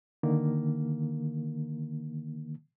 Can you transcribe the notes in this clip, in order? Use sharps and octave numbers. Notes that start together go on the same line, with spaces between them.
D3 D#3 A#3